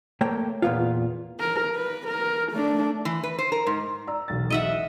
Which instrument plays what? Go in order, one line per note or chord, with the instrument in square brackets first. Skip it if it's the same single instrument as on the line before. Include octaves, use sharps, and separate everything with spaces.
[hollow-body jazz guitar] A3 A#3 C#5 G5
E2 A#2 E3 B3 F4
[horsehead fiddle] A#4
B4
A#4
A3 D4
[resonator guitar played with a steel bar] E3
B4
C5
A#4
G#2
[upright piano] D5 A#5 E6
E1 B1 A6
[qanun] D#5 E5 F#5